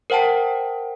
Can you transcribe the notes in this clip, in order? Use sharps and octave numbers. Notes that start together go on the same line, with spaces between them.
A#4 C5 F#5 G5 A5